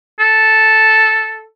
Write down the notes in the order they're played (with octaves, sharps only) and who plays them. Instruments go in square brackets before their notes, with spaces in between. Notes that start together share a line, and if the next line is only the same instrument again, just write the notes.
[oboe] A4